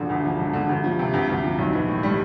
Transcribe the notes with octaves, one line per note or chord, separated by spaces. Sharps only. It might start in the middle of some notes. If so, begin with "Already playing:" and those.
Already playing: E1 D3 F3
D2
F3
E1
D3
D2
F3
C3
D2
D2
F3
B1
E3
A2
G3